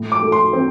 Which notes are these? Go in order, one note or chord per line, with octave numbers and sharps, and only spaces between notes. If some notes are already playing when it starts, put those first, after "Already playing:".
Already playing: A2
D6
A3
C6
C4